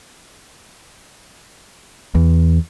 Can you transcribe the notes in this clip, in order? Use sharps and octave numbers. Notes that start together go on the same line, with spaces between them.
E2